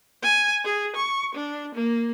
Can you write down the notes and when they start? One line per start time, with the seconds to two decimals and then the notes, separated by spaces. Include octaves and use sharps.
0.23 G#5
0.64 G#4
0.96 C#6
1.35 D4
1.75 A#3